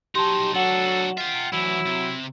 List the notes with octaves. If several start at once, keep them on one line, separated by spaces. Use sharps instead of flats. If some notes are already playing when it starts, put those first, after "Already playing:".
F#3 D#4 G4 A5 C6
F#3 D4 F#4 A4 F#5 E7 F#7
F4 E5 G5
D2 E3 F#3 E4
C3